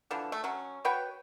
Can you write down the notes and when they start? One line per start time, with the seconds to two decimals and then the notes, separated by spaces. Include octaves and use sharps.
0.11 D3 E3 F3
0.32 A3
0.44 F#3 C#4
0.85 F#4 B4 C#5 G5